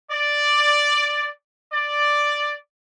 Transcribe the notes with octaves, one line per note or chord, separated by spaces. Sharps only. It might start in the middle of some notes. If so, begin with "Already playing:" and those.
D5
D5